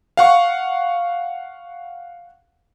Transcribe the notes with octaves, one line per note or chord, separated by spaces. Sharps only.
F5 F#5 C#6